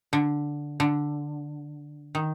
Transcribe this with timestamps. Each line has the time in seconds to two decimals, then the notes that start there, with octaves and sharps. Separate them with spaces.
0.13 D3
0.80 D3
2.15 D#3